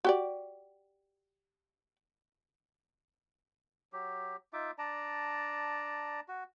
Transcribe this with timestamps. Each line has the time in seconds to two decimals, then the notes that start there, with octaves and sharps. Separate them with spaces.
0.05 F#4 G4 D5
3.93 F#3 G4
4.53 D#4 F4 E5 D6
4.78 D4 D5 A5 A#5
6.28 F#4